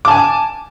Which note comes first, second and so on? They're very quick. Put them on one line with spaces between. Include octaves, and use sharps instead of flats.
D6 A5 G#5